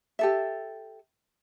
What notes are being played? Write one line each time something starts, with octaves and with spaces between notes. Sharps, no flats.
G4 A4 E5